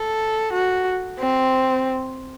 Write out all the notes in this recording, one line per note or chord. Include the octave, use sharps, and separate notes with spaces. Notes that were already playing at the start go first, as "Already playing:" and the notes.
Already playing: A4
F#4
C4